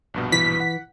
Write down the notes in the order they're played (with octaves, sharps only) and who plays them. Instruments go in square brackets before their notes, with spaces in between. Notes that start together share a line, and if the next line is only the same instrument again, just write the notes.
[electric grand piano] A#1 G2 B2
[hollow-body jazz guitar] E3 [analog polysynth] B6
[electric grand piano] F#5